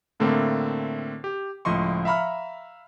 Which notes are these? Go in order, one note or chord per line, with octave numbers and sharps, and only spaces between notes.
A2 D3 A3 A#3 C4
G4
C#2 A2 F3 D#5 C6 C#6
E5 F5 A#5 B5 C#6 F6